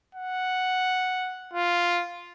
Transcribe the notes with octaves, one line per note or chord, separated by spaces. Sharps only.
F#5
F4